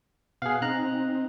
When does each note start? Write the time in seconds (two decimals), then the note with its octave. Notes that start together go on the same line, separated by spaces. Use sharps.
0.42 B2 G#4 F5 F#5
0.62 C4 D#4 A#5 F#6